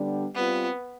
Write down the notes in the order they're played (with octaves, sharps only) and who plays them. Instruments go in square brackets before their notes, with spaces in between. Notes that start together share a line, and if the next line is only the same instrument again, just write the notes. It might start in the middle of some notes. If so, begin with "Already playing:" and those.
Already playing: [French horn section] D3 G3 B3 D4 G4
[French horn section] G3 C4 F4 [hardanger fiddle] B3